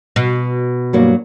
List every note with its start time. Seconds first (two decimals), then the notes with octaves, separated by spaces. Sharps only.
0.16 B2
0.93 G2 F#3 A#3